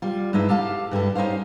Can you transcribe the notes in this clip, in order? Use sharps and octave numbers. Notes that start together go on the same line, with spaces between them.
G3 F4
G2 G#3 D#4 E4 E5
G4 A4 F5 A5
G2 G3 E4 A4
C#4 D#4 G4 C5 F5